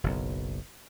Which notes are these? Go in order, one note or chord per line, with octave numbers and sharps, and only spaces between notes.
F#1 B1